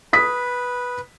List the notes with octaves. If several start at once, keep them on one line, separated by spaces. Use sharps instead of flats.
B4 D#6 B6